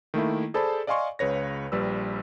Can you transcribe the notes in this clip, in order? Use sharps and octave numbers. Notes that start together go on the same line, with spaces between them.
D#3 A3 A#3 E4
G#4 A4 C5 D5 A5 B5
D5 D#5 F5 G#5 C6 C#6
C#2 C#3 B4 C#5 A#6
A#1 G3 B4 E6